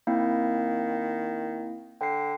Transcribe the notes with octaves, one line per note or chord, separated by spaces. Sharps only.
D#3 A#3 C4 E4
D3 G5 C7